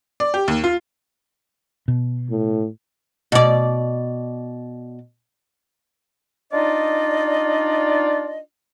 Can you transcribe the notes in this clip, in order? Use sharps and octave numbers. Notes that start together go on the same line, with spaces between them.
D5
G4
D#2
F4
B2
A2
B2 D5
D4 D#4 F4 D5 D#5